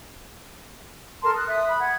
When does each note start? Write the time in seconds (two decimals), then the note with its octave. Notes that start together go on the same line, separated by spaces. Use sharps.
1.22 A4 A#4 A5 C6
1.35 D#6 F#6
1.48 E5 D#6 F#6
1.68 B5
1.80 F#5 G#6